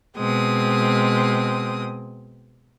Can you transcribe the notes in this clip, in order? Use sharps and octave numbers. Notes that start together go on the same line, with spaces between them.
B2 G#3 C4 D#6